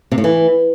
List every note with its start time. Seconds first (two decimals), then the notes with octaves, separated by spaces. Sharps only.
0.12 C3
0.18 A2
0.24 E3